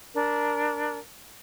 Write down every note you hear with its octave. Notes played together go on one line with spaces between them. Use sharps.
D4 A#4